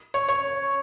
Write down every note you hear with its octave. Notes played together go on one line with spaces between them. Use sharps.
C#5
C#5